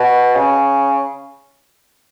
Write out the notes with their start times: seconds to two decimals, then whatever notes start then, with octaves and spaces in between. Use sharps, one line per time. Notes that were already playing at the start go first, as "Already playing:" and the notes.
Already playing: B2
0.35 C#3